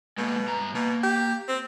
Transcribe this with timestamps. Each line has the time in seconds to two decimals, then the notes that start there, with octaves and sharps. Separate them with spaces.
0.18 B2 G#3 A#3
0.48 G2 A#5
0.75 B2 A#3
1.03 G4
1.48 C4